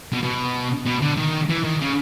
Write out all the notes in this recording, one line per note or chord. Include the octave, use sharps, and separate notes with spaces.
B2
B2
B2
D3
D#3
E3
D#3
C#3